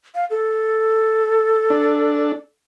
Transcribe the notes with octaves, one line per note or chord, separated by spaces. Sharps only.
F5
A4
D4